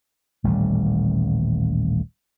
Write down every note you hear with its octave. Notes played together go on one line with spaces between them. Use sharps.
D#1 A1 A2 G3